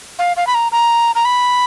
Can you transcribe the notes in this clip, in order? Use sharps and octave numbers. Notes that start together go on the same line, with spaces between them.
F5
F5
B5
A#5
A#5
A#5
B5